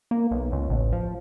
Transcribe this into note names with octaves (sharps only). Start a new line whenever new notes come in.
A#3
B1
C#2
A1
F3